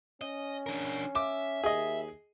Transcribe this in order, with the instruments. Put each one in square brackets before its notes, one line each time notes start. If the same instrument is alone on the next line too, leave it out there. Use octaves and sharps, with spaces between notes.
[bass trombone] C#4 [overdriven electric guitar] D#5
[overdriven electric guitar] D4 A#4
[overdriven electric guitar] E5 [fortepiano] D6
[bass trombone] D#2 [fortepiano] G#4 D#5